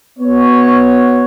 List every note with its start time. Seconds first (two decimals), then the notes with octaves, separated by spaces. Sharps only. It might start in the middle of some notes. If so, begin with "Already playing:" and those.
0.19 B3 F#4 C#5